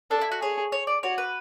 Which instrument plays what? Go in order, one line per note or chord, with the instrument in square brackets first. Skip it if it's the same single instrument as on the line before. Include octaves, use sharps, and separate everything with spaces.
[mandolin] D4 [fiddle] A4
[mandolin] E4
F#4
[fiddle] G#4 [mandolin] C#5
[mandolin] C#5
D5
[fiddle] F#4 [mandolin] C#5
[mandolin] B4